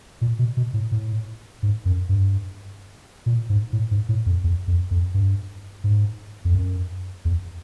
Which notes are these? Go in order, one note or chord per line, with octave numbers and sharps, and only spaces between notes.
A#2
B2
B2
A2
A2
G#2
F#2
G2
A#2
G#2
A2
G#2
A2
F2
E2
F2
F2
G2
G#2
F2
F#2
E2